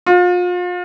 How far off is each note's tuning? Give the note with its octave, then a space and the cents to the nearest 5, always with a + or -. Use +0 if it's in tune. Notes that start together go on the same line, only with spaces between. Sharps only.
F4 +35